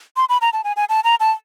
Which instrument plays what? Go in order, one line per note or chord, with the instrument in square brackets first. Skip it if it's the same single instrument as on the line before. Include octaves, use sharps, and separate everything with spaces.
[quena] C6
B5
A#5
A5
G#5
G#5
A5
A#5
A5